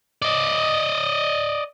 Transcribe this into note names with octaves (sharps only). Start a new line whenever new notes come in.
D5 D#5